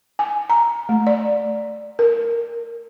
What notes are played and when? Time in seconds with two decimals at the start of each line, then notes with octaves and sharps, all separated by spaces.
0.19 G#5
0.50 A#5
0.89 A3
1.07 D5
1.99 A#4